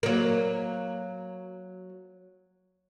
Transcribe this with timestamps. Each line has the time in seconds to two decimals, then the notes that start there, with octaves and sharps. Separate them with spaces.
0.03 F#3 A#3